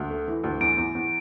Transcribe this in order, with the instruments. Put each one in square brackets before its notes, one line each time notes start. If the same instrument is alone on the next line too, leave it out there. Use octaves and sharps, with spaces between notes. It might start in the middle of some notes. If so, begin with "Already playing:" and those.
Already playing: [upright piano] D2
A3
E3
D2
[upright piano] E2 [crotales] D7
[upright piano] E2
E2